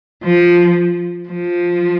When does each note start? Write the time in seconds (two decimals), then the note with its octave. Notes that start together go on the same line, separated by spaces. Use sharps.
0.24 F3
1.29 F3